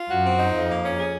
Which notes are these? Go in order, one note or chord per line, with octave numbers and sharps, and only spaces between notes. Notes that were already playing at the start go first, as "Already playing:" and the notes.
Already playing: F4
F#2 F#4
C4
D#4
F2 F3
A#3
C#4
G#4